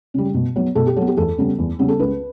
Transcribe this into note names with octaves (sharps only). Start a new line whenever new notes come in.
C#3 G3
B2
F#3 B3
B2 A4
G4
F#3 B3 A4
G4
E2 A4
C#3 G3 B3
E2
C#3 G3 B3
A4
C#2 B4